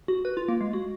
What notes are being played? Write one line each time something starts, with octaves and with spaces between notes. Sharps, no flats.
F#4
B4
F4
A#3
G#3
F#4